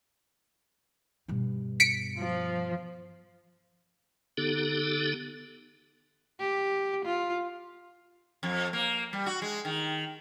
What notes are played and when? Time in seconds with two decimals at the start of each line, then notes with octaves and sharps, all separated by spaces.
1.28 G2 B2
1.80 B6 C#7 D7
2.16 F3
4.37 D3 B3 D#4 G4 A4
6.39 G4
7.05 F4
8.43 F2
8.73 A#3
9.13 G3
9.26 F#4
9.42 G#3
9.65 D#3